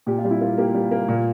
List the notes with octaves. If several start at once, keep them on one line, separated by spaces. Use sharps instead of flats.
A#2 G4
F4
G3
E4
A#3 F4
A#3 G4
G3
A#3
A#2